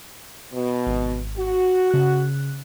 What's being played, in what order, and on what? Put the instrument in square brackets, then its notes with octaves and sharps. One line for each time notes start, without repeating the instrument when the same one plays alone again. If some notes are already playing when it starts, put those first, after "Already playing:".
[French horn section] B2
[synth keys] G#1
[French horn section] F#4
[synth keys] C#3 F#6